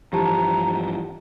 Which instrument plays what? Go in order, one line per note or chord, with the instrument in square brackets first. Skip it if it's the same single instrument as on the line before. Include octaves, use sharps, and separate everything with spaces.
[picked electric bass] G2 E3 F3 [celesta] G4 A5 [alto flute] A#5